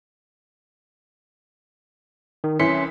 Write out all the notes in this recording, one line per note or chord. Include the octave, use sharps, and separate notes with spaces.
D#3
C2 E3 C#4 C6 B6 C#7